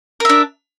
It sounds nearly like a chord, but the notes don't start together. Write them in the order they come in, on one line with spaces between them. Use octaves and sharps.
A#4 E5 D4